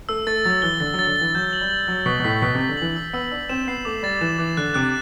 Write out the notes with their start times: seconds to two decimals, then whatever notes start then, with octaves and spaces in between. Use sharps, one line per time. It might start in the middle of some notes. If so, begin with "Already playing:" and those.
0.09 A3 E6
0.27 A3 A6
0.45 F#3 A6
0.62 E3 G7
0.80 D3 A6
0.94 F#3
0.99 A6
1.07 D3
1.16 E3 A6
1.35 F#3 G6
1.53 F#7
1.61 G3
1.70 F#7
1.88 F#3 G6
2.06 B2 B6
2.20 B2
2.24 A2 B6
2.42 B2 B6
2.55 C3 B6
2.69 D3
2.77 E3 F#7
2.96 E6
3.13 B3 E6
3.31 D4 E6
3.49 C4 E7
3.67 B3 C7
3.85 A3 D6
4.03 G3 A6
4.21 E3 E7
4.38 E3 D6
4.57 D3 F#6
4.74 C3 F#6